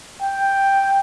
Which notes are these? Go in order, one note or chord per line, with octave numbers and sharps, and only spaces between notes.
G5